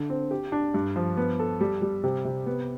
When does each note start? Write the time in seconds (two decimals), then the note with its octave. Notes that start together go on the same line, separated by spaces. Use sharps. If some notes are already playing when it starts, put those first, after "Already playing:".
Already playing: D3
0.10 C4
0.31 G4
0.52 D4
0.74 G2
0.96 F3
1.17 B3
1.39 A4
1.61 G3
1.82 G3
2.04 C3
2.25 C3
2.46 B3